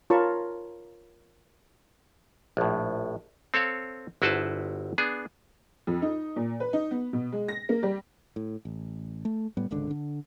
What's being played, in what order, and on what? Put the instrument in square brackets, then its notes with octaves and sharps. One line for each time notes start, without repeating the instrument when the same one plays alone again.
[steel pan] F4 A#4 C#5 A5 B5 C#6
[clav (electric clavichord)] A#1 A2
C4 A4 C#5 F5
G1 E4 F#4 B4 C5 A5
B3 D4 G#4
[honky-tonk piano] F2
D#4
A#2
B4
D#4
B3
B2
G#3
A#6
A#3
G3
[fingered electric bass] A2
A1
A3
A2 G3 B3
G#1 C#2 D3 D4
D3